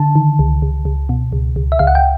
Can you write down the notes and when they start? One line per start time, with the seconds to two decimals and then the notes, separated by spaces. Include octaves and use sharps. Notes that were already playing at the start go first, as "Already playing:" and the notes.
Already playing: D3 A5
0.15 D#3
0.39 C#2
0.62 C#2
0.85 C#2
1.09 B2
1.33 C#2
1.56 C#2
1.72 E5
1.79 C#2 F5
1.87 F#5
1.95 G5